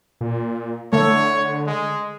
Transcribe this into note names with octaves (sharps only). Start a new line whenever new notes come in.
A#2
D3 A3 C#5
G#3